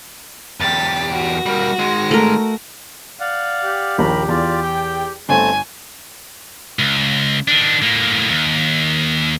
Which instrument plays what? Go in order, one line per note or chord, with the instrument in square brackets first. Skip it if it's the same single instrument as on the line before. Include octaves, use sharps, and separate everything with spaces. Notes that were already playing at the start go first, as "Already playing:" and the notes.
[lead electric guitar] E2 G4 [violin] A6 B6
[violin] F#4 A#6
[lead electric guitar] G3 A#3
D#3 G#3
[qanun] A3 A#4
[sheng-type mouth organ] D5 F5 F#5
[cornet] G4
[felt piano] A#1 D#2 [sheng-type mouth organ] A#4 B5
[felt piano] E2 [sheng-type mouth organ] F4 D5
[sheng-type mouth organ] G5
[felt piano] G1 [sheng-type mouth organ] A3 C4 A5 [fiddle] G#5
[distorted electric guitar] C#2
D#3 D4
A2 A#3
D#2